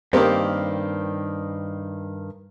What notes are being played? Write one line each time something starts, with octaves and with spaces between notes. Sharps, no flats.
G2 D#3 A#3 C4 G4